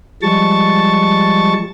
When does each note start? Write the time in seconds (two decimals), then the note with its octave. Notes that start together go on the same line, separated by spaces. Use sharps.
0.22 F3 G3 G#3 A5 C#6 A6